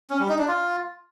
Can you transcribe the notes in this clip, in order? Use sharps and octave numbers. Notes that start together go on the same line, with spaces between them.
C#4
G3
D#4
D4
F4